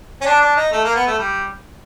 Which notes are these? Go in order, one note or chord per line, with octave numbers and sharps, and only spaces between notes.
C#4
D4
D4
D#4
A3
A#3
B3
A3
G3